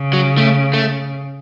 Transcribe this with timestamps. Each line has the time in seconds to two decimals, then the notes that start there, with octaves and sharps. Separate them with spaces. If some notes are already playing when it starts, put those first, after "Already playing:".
Already playing: C#3
0.13 F#3
0.38 A3
0.74 A3